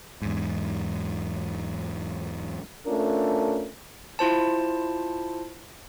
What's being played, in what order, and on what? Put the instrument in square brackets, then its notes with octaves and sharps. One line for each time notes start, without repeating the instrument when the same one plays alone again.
[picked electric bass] E2 G#2
[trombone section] A3 C#4 D4 F4 A#4
[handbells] E4 F4 C5 A5